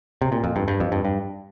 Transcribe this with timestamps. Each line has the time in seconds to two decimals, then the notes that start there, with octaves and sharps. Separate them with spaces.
0.22 C3
0.32 A#2
0.44 F2
0.56 G2
0.68 G2
0.80 F2
0.92 G2
1.05 G2